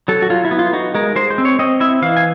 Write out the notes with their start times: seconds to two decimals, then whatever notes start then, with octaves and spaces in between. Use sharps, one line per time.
0.08 F#3 A4
0.22 F#4
0.30 F#3 F4
0.45 E4
0.51 B3
0.59 F4
0.73 D#4 F#4
0.95 G#3 A#4
1.16 G#3 C5
1.30 C5
1.38 C4
1.45 C#5
1.59 C4 D#5
1.80 E4 E5
2.02 E3 F5
2.16 G#5